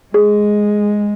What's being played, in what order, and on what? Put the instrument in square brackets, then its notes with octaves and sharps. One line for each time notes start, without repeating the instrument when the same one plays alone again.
[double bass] G#3 [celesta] G#4